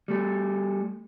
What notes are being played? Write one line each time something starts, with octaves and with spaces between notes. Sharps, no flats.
G3 A3